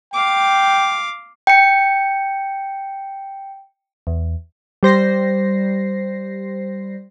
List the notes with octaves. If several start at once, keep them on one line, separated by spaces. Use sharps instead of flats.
F5 G5 D6
G5 C#7
E2
G3 C5 A#6 C7